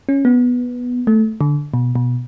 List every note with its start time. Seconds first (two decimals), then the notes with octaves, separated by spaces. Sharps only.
0.09 C#4
0.25 B3
1.07 A3
1.41 D3
1.74 B2
1.96 B2